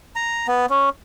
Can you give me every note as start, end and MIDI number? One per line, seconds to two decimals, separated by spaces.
0.16 0.47 82
0.48 0.66 59
0.70 0.89 61